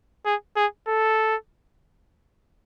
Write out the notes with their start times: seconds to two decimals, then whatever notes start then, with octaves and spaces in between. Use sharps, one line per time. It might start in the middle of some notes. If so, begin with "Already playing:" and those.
0.26 G#4
0.57 G#4
0.88 A4